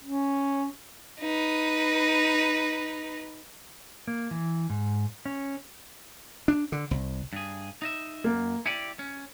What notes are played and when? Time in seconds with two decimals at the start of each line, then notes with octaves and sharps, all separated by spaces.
0.04 C#4
1.20 D#4 B4
4.08 A#3
4.31 E3
4.70 G#2
5.26 C#4
6.48 D4
6.72 D3
6.91 C2
7.33 G2 G#4
7.82 D#4 D#5 E5
8.24 F#2 A#3
8.66 E4 G4 D5 C#7 D#7
8.99 C#4